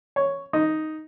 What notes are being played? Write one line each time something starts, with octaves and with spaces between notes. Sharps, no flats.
C#5
D#4